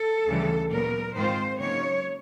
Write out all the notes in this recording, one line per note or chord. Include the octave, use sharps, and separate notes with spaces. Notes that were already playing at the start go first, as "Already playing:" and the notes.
Already playing: A4
D2 C#3 E3 G3
A#2 F#3 B3 A#4
G#2 D#3 G#3 C4 F4 C5
C#3 F#3 A#3 D#4 C#5